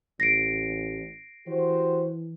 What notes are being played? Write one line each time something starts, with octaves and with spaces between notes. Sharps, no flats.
A1 A#6 C7 D7
E3 F#4 G4 C5